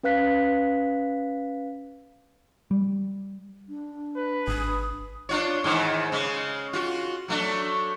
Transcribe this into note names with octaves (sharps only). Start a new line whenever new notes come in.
C#4 B4 F5 F#6 B6
G3
D4
B4
G#1 D#6
D4 F4 C#5
G#2 D#3 E3
C#3 G#3
F4 F#4
F#3 A3 D4